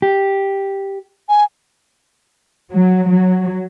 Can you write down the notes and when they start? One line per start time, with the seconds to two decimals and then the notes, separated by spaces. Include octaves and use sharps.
0.02 G4
1.29 G#5
2.72 F#3
3.10 F#3